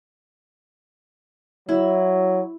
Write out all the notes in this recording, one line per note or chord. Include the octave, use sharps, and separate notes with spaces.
F#3 E4